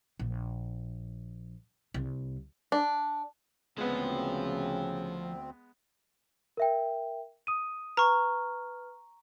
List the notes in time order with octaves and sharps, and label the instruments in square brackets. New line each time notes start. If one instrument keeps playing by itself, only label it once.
[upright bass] A#1
C2
[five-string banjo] D4
[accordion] D2 C4 [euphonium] C#3 [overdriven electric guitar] F3 [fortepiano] G#3 B3
[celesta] A#4 E5 G5
D#6 D#7
[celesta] B4 F6 [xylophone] A#5 C#6